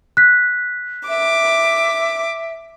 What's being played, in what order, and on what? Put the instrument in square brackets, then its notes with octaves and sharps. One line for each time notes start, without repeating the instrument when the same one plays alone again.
[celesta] F#6 B6
[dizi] E5 [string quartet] D6